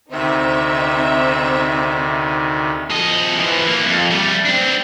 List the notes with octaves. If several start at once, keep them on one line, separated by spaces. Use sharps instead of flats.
D2 C3 D#3 C4 D#4 E5
F3 D#5
E3 F3
E3 A#3
F2
G3 A3
C4 D4